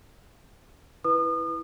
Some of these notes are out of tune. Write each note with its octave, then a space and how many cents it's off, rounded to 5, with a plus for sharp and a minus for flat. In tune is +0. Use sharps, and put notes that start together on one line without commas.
E4 +0 B4 +0 D#6 -35